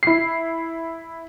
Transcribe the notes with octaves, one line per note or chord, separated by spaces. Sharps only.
E4 C7